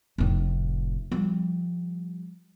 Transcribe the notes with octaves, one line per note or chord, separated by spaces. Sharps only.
F1 A2
F3 G3